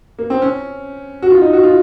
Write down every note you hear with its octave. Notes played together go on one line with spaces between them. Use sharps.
A#3
C4
C#4
F#4
F4
D#4
F#4
F4